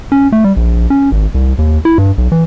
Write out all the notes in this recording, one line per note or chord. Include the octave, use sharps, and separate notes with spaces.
C#4
A3
G3
A#1
C#4
G#1
C2
D#2
E4
G2
B1
E3